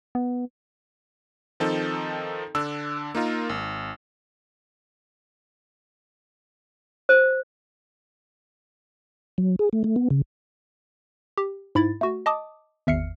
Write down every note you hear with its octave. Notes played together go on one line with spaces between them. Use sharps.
B3
D#3 F3 C4 D#4 A4
D3 D4 E6
A#3 D#4 F4 A#4
G#1
C5
F#3
G#4
A3
A3
B3
C#3
G4
G#2 E4 B5 A6
A3 F#4
D#5 A5 D6 D#6
G#1 E2 E5 F6 C7 C#7